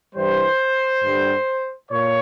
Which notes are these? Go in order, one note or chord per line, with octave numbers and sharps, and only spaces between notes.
G2 E3 G3 C5
G2 D3 G3
A#2 C#5